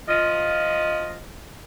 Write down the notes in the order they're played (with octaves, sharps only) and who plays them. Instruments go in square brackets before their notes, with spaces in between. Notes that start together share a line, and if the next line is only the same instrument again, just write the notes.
[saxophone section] F3 F4 D#5